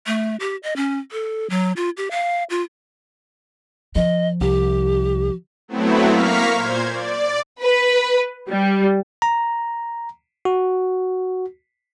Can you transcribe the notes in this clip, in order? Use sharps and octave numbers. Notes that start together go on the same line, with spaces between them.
A3
G4
D#5
C#4
A4
F#3
F4
G4
F5
F4
F3 D#5
C2 G4
F#3 A3 B3 C4 E4
A#3 F5 A#5 C#6 F6 B6
A#2 C5 G#6
D5
B4
G3
A#5
F#4